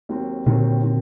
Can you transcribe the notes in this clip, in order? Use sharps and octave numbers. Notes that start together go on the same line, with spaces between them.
D#2 D#3 F#3 C4
D#2 A#2 D3 D#3 F#3 C4
D#3 F#3 C4